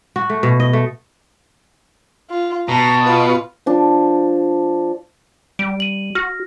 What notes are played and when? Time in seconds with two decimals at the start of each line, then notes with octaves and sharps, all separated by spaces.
0.16 F#4
0.30 A3
0.43 B2
0.60 D#5
0.73 A3
2.30 F4
2.69 B2 A5 A#5
3.06 F4 B4
3.66 F3 D4
5.59 G3 D7
5.80 D#7 F#7
6.15 F#4 F6 A#6